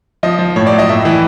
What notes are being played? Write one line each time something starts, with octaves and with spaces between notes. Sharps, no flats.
F3 D#5
F3
A2 C#5
D5
F#3
D#5
A2 E5
E3